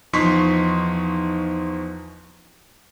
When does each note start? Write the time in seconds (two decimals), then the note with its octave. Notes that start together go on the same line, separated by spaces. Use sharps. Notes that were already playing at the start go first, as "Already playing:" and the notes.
0.13 E2 F3 D#4 C6 C#6 B6